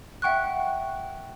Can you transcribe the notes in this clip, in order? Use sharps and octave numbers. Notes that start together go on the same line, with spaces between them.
E5 F#5 G5 C#6 F#6